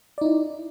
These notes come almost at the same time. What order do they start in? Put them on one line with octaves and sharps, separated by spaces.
D5 D#4 E4